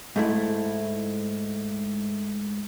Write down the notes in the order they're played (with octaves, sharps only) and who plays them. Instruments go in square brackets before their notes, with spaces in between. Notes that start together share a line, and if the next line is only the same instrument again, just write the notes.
[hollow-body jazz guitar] G#2 A3 E4